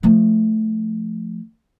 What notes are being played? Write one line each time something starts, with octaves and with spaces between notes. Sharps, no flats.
F3 A3